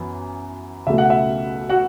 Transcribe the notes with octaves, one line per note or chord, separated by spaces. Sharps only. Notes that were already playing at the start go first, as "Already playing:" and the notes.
Already playing: F#2 E3 B3
C#2 B2 A3 E5
F#5
E5
F#4 F#5